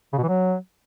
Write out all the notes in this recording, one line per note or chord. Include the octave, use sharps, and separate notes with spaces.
C#3
B2
E3
F#3